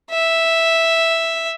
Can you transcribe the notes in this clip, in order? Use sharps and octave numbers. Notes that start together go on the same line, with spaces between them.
E5